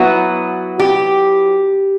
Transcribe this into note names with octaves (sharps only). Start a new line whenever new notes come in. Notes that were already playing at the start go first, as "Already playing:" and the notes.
Already playing: F#3 B3 E4 F#4
G4